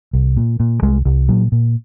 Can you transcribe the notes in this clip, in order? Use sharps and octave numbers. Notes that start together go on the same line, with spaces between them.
C2
A#2
A#2
C2 G#3
C2
A#2 F#3
A#2